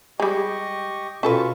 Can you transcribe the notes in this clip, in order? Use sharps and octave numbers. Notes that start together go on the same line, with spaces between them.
G3 G#3 G4 D#5 C#6
B2 C#4 F4 A4 B4 C#6